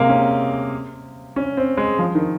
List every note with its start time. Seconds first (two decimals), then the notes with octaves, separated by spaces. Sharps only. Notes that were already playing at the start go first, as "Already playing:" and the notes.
Already playing: C3 G#3 A#3
0.09 C#4
1.36 C#4
1.57 C4
1.77 G#3
1.99 F3
2.15 D#3